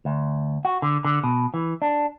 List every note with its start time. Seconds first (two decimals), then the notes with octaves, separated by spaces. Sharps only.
0.05 D2
0.65 F#4
0.82 D3
1.05 D3
1.24 B2
1.54 E3
1.82 D4